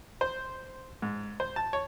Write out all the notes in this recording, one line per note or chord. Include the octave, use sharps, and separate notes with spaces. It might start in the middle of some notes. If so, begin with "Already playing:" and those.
C5
G#2
C5
A5
C#5